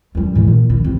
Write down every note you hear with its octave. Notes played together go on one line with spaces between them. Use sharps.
F#2 G3
G#2 E3
A#2
D#3
C3 E3